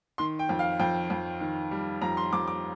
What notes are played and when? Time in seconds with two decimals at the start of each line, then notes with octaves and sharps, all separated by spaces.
0.18 D#3 C6
0.39 G5
0.49 F2
0.59 F5
0.79 F2 G5
1.10 F2
1.41 D#3
1.71 G3
2.02 F2 A#5
2.17 C6
2.33 F2 D6
2.48 D6